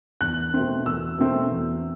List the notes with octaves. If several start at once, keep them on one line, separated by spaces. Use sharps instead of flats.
E2 F#6
B2 A3 C4
E2 E6
B2 A3 C4
E2